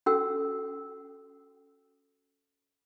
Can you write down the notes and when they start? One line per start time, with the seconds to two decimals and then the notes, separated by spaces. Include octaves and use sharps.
0.06 C#4 F#4 A4 G5 E6